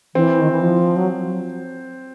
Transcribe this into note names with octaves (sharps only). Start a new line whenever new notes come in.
E3 C4
D#3
E3
F3
F#3